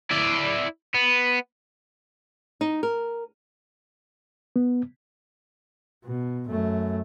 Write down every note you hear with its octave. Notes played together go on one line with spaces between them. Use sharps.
E4 D5
B3
D#4
A#4
B3
B2
F#2 A3